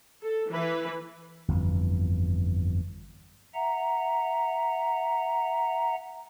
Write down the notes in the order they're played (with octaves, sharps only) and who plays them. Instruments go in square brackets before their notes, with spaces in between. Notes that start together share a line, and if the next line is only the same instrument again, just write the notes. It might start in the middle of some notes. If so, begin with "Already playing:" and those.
[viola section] A4
E3 B4
[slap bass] G1 F2 E3
[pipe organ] E5 F#5 A#5